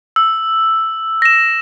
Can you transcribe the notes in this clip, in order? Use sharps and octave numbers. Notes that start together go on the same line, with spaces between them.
E6
A#6 E7